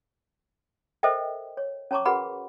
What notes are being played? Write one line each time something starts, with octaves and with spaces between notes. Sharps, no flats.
A4 A#4 C5 D#5 E5 G5
C#5
C#4 C#5 A5 A#5 C#6 D6
F#4 G#4 A#4 B4 F#5 B5